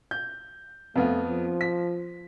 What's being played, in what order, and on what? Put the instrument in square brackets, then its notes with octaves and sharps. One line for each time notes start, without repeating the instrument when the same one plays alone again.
[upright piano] G6
[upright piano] F2 B3 F4 [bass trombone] A3
[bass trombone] F3
[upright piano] B6